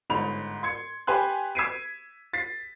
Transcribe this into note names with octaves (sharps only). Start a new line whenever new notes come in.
G1 G#2 B5 F7
C6 G#6 C#7
G4 B4 G#5 C6 F#6
E6 G#6 B6 C7 D7 D#7
A6 B6 C7